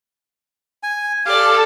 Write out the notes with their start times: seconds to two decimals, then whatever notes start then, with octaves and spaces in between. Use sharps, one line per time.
0.83 G#5
1.26 G4 A4 D5 F5